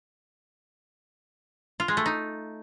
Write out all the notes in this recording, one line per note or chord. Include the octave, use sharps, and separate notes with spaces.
F4
G#3
A3
D#4